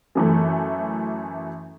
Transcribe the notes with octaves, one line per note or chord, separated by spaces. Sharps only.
F#2 E3 A3